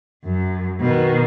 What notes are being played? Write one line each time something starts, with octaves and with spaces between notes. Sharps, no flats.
F#2
B2 D#3